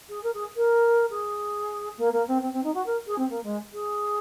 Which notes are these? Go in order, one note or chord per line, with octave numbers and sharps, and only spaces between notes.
G#4
A#4
G#4
A#4
G#4
A#3
A#3
C4
C4
C4
D#4
F#4
A#4
G#4
C4
A#3
G#3
G#4